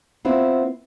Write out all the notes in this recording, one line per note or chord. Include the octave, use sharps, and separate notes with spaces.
B3 C4 E4 F4